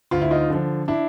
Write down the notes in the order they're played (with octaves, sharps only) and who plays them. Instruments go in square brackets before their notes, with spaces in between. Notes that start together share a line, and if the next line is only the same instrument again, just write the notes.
[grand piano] D2 F4
E4
D#4 F4
D3 F3
D4 E4